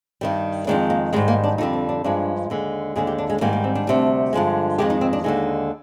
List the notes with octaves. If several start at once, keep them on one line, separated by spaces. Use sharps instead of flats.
G2 D#3 G3
F2 D#3 G#3 D4
A#3
G#2 D#3 G3 G#3
A#3
D4
F2 D3 G3 D#4
C4
D4
G2 F3 G#3 D4
D#2 D3 G#3
D#2 D3 G#3 G#4
G4
D4
G#3
G#2 D#3 G3 A#3
A#3
C4
D4
D2 C3 G3
G2 D3 F3 G#3
F2 D#3 G#3 G4
D#4
C4
D4
D#2 D3 G#3 D#4